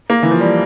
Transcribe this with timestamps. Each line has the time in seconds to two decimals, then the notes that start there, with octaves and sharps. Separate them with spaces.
0.10 A#3
0.23 E3
0.31 F3
0.40 G3